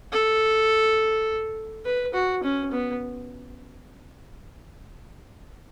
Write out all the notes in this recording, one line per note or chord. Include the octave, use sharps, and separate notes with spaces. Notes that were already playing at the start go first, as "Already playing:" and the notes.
A4
B4
F#4
C#4
B3